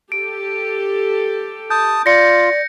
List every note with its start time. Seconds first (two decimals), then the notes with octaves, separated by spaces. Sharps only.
0.12 G4 A4 D7
1.70 A5 D#6 G6
2.06 F4 D5 A#6 C#7